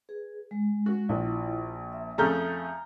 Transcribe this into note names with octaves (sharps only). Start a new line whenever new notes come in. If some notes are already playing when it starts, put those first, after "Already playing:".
G#4 B4
G#3
F#4
A#1 E4 F4
E5
F2 C#3 A3 A#5 F6 G6